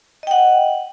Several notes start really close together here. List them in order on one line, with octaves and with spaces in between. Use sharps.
D#5 G5 F#5